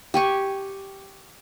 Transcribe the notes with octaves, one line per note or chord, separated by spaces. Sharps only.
G4 G#5 C#6